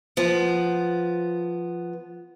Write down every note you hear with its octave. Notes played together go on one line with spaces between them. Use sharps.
F3 B3